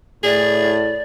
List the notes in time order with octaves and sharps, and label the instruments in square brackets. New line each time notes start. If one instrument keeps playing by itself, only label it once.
[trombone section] A2 [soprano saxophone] G#4 [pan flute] D5